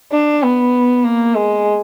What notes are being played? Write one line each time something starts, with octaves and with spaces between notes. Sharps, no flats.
D4
B3
A#3
G#3